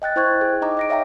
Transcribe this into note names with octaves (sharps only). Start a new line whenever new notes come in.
D#5 G5 F#6 A6
E4 C5 G5 C#6 F#6 G#6
G#4
D#4 D#5 A#5 D6
D#5 A#6 D7
C#5 E5 F5 G5 A#5